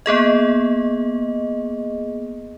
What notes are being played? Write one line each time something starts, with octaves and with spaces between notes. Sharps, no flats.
A#3 B3 G#4 D#5